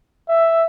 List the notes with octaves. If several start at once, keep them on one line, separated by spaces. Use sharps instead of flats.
E5